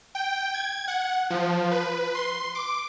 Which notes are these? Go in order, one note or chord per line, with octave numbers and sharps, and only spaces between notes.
G5
G#6
F#5
F3
B4
C6
D6